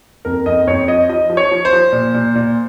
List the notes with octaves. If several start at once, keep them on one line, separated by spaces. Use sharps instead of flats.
F2 A#4
F2 D#5
F2 C#5
F3 D#5
F3 D#5
F3
C#5
F3
C5
F3
A#2
A#2
A#2